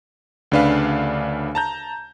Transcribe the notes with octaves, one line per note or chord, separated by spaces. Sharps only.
D2 C#3 D4 B4 F5
A5 A#5 G6